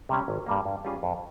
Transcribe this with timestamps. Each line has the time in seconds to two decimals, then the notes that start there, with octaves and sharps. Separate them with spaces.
0.09 C3 G3 C#4
0.28 G#1
0.46 G2 G3 A#3
0.65 G2
0.85 G3 C#4 F4 G#4
1.03 F2